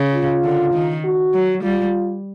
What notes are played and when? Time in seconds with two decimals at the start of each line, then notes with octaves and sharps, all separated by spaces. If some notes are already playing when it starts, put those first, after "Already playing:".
Already playing: C#3
0.14 F4
0.44 D3
0.74 D#3
1.04 F#4
1.34 F#3
1.63 G3 F4